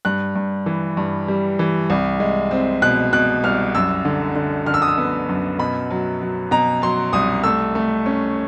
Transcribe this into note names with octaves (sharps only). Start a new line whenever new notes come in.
G2 F#6
G2
E3
G2
G3
E3
C2
G#3
C4
B2 F#6
B2 F#6
C2 F6
F#2 E6
D3
D3
D3 F6
E6
D#6
E6
B3
F#2
B2 B5
F#3
F#3
B2 A#5
F#3 C6
C2 D#6
A3 E6
A3
C#4